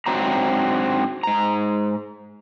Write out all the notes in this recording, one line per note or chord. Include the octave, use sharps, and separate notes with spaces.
G#2 F#3 C4 D4 A#5
G#2 A#5